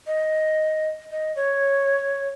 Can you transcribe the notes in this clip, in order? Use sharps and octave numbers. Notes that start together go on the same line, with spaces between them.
D#5
D#5
C#5